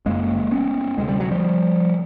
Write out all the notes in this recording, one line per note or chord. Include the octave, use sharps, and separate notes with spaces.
F#1 F#2 C#3 G#3 A#3
B3 C#4
D2 C3 G#3
G3
F#3
F3 G3